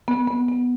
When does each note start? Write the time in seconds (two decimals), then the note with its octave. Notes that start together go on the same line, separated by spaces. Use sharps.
0.08 B3
0.27 B3
0.48 B3